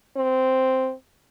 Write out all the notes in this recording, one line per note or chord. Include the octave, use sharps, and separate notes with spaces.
C4